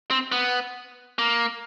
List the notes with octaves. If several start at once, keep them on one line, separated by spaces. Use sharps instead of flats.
C4
B3
A#3